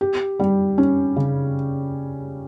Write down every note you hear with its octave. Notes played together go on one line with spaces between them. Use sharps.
G4
G3
C#4
C#3